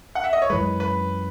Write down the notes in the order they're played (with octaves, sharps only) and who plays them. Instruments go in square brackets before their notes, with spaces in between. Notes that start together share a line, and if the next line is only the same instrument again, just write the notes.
[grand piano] F#5
E5
D#5
C#5
[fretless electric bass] F#2 E3 G#3 [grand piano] B4
[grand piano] B4